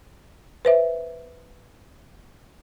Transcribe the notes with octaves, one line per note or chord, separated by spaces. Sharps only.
B4 C5 E5